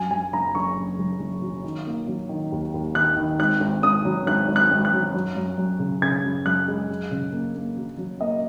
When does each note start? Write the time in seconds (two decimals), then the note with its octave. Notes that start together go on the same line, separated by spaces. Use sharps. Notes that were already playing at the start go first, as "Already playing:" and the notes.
Already playing: F#2 G#5
0.11 F#2 G#5
0.33 F#1 A#5
0.55 F#1 C#6
0.77 F#1
0.99 F#1
1.20 F#1
1.42 F#3
1.64 D#3
1.86 A#3
2.07 F#3
2.29 D#3
2.52 D#2
2.74 D#2
2.95 D#3 F#6
3.17 D#3
3.39 G#1 F#6
3.60 G#1
3.83 G#1 D#6
4.05 F#3
4.27 G#1 F#6
4.48 G#1
4.56 F#6
4.71 G#1
4.85 F#6
4.93 F#3
5.14 F#2
5.37 F#2
5.58 F#2
5.79 C#3
6.02 C#3 G#6
6.24 F#2
6.46 F#2 F#6
6.68 G#3
6.89 F#2
7.11 C#3
7.32 A#3
7.55 A#3
7.77 F#3
7.98 F#3
8.21 A#3 D#5